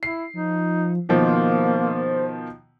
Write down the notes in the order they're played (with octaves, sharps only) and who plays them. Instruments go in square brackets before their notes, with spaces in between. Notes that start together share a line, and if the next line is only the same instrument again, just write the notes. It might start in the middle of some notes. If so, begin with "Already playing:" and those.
[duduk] E4 [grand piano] C7
[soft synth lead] F3 [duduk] D#4
[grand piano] B2 D#3 F3 [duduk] A#3 [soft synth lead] C5